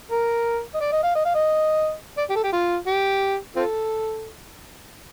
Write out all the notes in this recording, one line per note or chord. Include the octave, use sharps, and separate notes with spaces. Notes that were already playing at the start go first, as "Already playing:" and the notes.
A#4
D#5
D5
D#5
F5
D#5
F5
D#5
D5
G4
A4
G4
F4
G4
C4 F4 A4